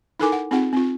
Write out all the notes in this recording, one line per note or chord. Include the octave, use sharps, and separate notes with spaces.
D#4 E4 A4 A#4 G#5 D6
F#5
C4 D#4 F4 G#4 F#5 G5
C4 F4